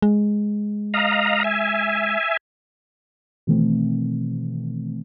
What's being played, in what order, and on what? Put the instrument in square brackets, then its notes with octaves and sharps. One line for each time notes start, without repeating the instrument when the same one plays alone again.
[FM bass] G#3
[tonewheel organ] D#5 F5 A#5
E5 G#5
[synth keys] B2 D#3 E3 A3 C4